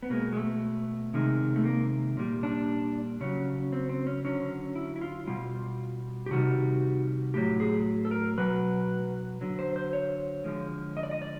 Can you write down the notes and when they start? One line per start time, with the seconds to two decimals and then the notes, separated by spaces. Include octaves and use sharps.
0.03 B3
0.10 B2 G#3 A#3
0.33 G#3
0.37 A3
1.14 C3 D#3 G#3
1.56 A3
1.65 A#3
2.17 A#2 G3
2.43 D4
3.21 C#3 F#3 C#4
3.72 C4
3.89 C4
4.07 C#4
4.24 D3 F#3 C#4
4.75 E4
4.96 E4
5.01 F4
5.27 B2 G3 F4
6.26 G4
6.31 C3 D#3 G3 F#4
7.34 A2 F#3 G4
7.60 G#4
8.05 A4
8.11 A#4
8.38 B2 F#3 B4
9.41 D3 F#3
9.59 C5
9.76 C5
9.93 C#5
10.44 D3 F3 G#3
10.97 D#5
11.03 D5
11.11 D#5
11.22 D5